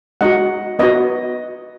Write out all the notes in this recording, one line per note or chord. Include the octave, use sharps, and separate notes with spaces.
G#3 D#4 F#4 D#5 F#5
B3 D#4 F#4 B4 D#5